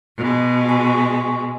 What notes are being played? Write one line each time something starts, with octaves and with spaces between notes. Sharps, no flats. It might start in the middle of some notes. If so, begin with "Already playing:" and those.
B2 G#3
G#5 C#6